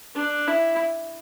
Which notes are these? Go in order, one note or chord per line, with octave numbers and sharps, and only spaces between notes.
D4
E4